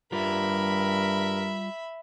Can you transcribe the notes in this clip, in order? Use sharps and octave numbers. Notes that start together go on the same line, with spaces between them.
G2 G3 F4 A#4 E5 B5